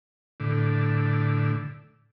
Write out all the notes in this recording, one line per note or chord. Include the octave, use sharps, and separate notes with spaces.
A2 D3